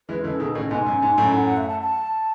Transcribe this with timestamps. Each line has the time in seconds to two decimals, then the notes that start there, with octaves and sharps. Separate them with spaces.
0.09 E3 G#3 B4
0.24 C#3 E3 A4
0.39 B2 D#3 G#4
0.55 A2 C#3 D#5
0.70 G#2 B2 G#5
0.86 F#2
1.02 G#2
1.18 F#2 A2
1.34 F#5
1.44 F#5
1.57 E5
1.68 A5
1.80 A5